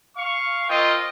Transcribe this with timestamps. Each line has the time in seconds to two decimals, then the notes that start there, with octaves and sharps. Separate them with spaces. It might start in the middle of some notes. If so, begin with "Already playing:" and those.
0.16 F5 C#6
0.69 C4 F4 A#4 D#5 G5